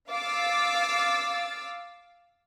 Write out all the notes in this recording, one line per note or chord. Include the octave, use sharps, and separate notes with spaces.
F5 D6 E6 A6